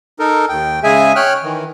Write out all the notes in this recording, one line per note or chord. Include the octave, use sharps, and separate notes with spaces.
D#4 A4 A#4
D#2 G5
C#3 G#3 G#4 E5 G#5
C#5 G5 F6 F#6
D#3 E3